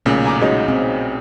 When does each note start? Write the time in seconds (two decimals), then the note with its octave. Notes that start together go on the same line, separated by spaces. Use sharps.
0.06 B1 A#2 C#3 A3 C#4
0.25 G#5 A#5 D6
0.41 G#3 C#4 D#4 F#4
0.68 C4